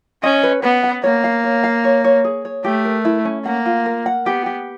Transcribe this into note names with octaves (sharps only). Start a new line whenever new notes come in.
C#4 D#5
B4
B3 B4
F#5
A#3 C#5
F5
C#5
F5
C#5
C#5
G#4
C#5
A3 G4
A#4
E4
C#4
A#3 F#5
F4
A#4
F#5
B3 G4
G4